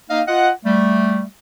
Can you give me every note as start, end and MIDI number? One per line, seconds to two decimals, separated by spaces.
0.10 0.22 58
0.10 0.22 63
0.10 0.22 75
0.10 0.22 77
0.27 0.50 65
0.27 0.50 75
0.27 0.50 78
0.66 1.24 55
0.66 1.24 57